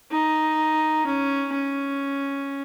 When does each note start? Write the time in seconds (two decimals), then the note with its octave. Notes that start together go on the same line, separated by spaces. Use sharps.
0.11 D#4
1.06 C#4
1.53 C#4